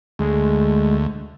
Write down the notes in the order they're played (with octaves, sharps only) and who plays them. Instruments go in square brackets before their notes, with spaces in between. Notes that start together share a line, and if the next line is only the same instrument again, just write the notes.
[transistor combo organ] D2 [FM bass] G#3